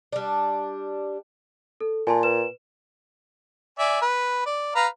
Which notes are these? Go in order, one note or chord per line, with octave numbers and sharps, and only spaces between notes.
G3 D4
A4
A#2 G#5 A5 C6
B4 E7
D5 E5 G#5
B4
D5
B4 F5 A#5